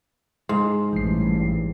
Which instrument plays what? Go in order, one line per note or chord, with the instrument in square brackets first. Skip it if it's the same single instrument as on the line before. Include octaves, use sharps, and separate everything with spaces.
[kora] G#2 [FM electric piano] C6
[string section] A1 G2 [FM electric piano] E3 C7